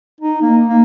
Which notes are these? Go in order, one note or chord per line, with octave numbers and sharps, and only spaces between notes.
D#4
A#3
A#3